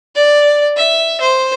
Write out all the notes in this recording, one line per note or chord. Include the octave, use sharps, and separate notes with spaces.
D5
E5
C5